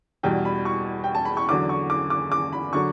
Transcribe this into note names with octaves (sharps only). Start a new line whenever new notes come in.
E2 B2 G3 G5
B5
C#6
G5
A5
B5
C#6
E2 D3 F#3 D6
C#6
D6
D6
D6
B5
D3 F#3 C#6